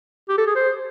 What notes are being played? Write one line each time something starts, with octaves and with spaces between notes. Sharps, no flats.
G4
A4
G#4
C5